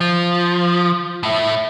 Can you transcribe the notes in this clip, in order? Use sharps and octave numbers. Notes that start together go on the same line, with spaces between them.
F3
A2 E4